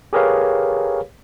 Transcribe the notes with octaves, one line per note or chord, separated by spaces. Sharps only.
G4 G#4 A#4 B4 C#5 F5